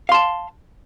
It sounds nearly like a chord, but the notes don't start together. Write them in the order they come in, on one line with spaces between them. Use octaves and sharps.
F5 C6 A5